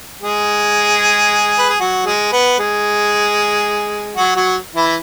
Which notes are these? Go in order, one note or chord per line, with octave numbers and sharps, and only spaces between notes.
G#3 G#4
B4
G#4
F#3 F#4
G#3 G#4
B3 B4
G#3 G#4
F#3 F#4
F#3 F#4
E3 E4